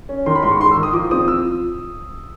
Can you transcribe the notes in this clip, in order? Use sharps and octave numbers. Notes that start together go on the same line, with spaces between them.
C#4
D#3 C6
B5
G#2 C6
C#6
G#2 C6
E6
D#3
D#6
F3 D6
C4 D#6
F3 E6